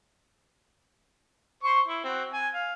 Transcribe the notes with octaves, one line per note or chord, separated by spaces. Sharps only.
C5 C#6
E4
C4 F#4
G#5
F5